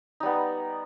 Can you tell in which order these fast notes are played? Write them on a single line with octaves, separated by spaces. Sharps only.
D#4 G3 B3